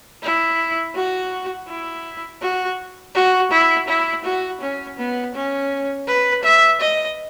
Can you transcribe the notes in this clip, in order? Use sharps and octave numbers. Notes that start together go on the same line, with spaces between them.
E4
F#4
E4
F#4
F#4
E4
E4
F#4
C#4
B3
C#4
B4
E5
D#5